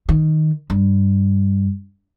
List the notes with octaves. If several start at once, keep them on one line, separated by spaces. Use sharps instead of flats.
D#3
G2